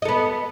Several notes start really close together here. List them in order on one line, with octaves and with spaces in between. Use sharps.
D#5 A4 B3